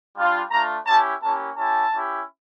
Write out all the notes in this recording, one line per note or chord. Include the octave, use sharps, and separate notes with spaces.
G3 D4 F4
A3 D4 F4 A#5
C#4 E4 G4 A5
A#3 C#4 E4 G4 A5
C#4 E4 G4 A5
C#4 E4 G4